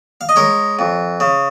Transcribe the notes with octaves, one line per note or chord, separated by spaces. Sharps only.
F5
D#5
G#3 A#4 C#5
F2
C#3